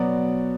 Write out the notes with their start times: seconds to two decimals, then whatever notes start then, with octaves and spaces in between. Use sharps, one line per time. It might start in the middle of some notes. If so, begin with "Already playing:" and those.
Already playing: B2 F#3 B3 F#4 D5